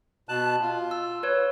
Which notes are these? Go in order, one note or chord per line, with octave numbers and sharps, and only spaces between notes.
B2 A5 F#6
F4
E6
B4 C#5